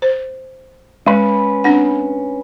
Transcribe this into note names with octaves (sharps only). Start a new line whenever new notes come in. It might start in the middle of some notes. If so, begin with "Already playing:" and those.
C5
G#3 C#4 B4
C4 D4 F#5